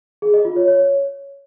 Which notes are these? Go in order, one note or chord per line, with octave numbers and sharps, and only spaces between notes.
G#4
D#5
F4
C#5
C#5